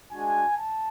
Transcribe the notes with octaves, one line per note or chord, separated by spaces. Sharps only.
G#3 D4 F#4 G#5
A5